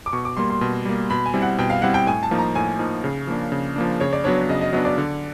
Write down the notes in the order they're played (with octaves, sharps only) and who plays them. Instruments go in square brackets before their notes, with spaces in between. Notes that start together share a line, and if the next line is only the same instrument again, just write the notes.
[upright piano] D6
[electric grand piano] B2 [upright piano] C#6
[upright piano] D6
[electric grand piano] G3 A#3 [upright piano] C6
[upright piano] C6
[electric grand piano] B2
G3 A#3
[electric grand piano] B2 [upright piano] B5
[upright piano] G#5
[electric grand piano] G3 C4 E4
[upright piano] F#5
[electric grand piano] B2 [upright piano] G5
[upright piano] F5
[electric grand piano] G3 C4 E4 [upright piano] F#5
[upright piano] G5
[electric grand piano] A2 [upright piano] G#5
[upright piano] A5
[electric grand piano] F3 A#3 D#4
[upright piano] A#5
[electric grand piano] A2 [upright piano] G#5
[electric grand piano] F3 A#3 D#4
C#3
F3 A#3 D4
C#3
F3 A#3 D4
[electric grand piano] C#3 [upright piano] C#5
[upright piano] D5
[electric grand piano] F#3 B3 D4 [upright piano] C#5
[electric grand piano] C#3 [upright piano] D#5
[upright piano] D#5
[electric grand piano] F#3 B3 D4 [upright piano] D#5
[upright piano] D5
[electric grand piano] D3